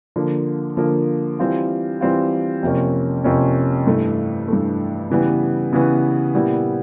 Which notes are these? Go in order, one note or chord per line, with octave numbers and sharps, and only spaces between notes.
D3 F3 A#3
D3 F3 A#3
E3 G3 C4 F4
E3 G3 C4 F4
F2 C3 F3 A#3 C#4
F2 C3 F3 A#3 C#4
G2 E3 A3
G2 E3 A3
C#3 E3 G3 B3
C#3 E3 G3 B3
A#2 G3 B3 E4